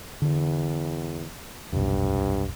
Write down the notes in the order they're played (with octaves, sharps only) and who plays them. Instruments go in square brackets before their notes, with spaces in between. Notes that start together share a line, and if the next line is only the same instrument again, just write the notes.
[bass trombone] E2 [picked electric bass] D3
[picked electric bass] F1 B1 [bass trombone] G2